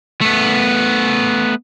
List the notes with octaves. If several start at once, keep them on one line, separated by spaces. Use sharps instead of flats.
A3 B3